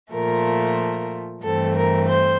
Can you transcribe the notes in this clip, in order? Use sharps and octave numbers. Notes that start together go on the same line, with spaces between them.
A#2 F3 A3 A#4
G2 E3 A3 C4 A4
A#4
C5